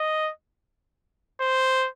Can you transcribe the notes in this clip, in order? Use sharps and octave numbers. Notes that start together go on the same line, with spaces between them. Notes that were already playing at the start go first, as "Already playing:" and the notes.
Already playing: D#5
C5